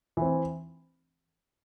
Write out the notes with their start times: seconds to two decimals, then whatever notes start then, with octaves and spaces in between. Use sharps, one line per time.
0.17 E3 C4